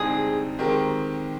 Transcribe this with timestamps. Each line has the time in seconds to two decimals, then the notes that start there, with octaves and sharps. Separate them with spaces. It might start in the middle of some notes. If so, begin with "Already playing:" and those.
Already playing: G2 D3 G#3 C4 D#4 G#4
0.59 D#3 G#3 C4 G4 A#4